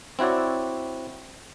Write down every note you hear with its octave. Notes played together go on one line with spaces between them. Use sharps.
C4 E4 F#4 C#5 D5